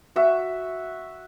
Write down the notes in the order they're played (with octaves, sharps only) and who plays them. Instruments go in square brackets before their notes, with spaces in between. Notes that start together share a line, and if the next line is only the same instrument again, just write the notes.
[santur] F#4 E5